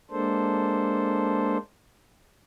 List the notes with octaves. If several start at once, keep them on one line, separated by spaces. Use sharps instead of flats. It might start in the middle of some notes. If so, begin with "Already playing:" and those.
G#3 A#3 D4 A4 C5